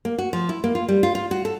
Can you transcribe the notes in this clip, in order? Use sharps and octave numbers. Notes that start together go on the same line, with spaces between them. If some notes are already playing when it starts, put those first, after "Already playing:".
A#3
F#4
F3
E4
A#3
F4
G3
F4
F4
F#4
A4